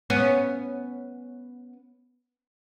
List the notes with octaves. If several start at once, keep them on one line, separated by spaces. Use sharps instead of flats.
B3 C#4